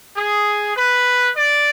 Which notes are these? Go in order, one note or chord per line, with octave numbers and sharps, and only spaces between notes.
G#4
B4
D5